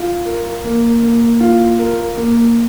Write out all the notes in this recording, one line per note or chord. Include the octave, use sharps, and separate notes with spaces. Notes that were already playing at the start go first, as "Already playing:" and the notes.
Already playing: F4
A#4
A#3
A#3
F4
A#4
A#3